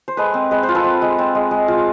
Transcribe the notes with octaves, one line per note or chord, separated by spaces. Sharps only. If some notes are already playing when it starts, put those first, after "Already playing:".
C5
G#3 A4 B4
C4
G#3 B4
C5
F4
A4 B4
C4
G#3
C4
G#3
G#3
F4